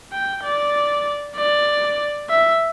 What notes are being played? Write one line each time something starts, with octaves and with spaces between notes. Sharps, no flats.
G5
D5
D5
E5